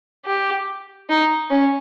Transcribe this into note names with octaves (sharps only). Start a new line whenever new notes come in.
G4
D#4
C#4